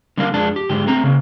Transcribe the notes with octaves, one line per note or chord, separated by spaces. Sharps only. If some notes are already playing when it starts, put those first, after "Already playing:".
D3 G3 A#3 D4 A#4 F5
F2 G#3 D4 A5
G4
G#2 D3 G4
A3 C4 A#5
C#3 A#3